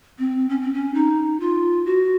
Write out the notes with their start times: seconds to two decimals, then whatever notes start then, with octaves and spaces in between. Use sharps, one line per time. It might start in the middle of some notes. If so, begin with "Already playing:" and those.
0.19 C4
0.49 C#4
0.61 C4
0.74 C#4
0.94 D#4
1.40 F4
1.85 F#4